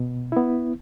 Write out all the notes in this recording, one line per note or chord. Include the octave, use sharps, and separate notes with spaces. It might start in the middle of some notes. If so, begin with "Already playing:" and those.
Already playing: B2
B3 E4